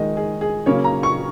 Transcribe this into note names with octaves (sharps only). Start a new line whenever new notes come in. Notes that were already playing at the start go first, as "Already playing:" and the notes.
Already playing: D#3 G#3 D#5
G#4
G#4
C#3 F#3 A#3 C#5
A#5
C#6